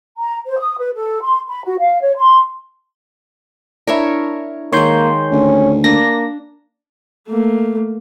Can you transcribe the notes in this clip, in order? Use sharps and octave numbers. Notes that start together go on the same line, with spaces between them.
A#5
C5
D#6
B4
A4
C6
B5
F#4
F5
C#5
C6
D4 E4 A#4 C#5 E5
D#3 G#3 A#3 C#5 C6 G6
D2 C#4
A#3 D4 A#6
A3 A#3